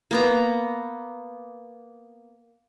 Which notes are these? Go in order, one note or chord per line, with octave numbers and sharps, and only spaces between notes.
A#3 B3 A#5